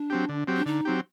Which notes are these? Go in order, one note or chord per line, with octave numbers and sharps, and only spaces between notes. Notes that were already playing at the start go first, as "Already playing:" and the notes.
Already playing: D4
F#3 C4 G4
D3
F#3 C4 G4
D4
D3 D#4
F#3 C4 G4